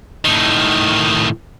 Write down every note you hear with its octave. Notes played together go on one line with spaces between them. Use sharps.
A2 D#3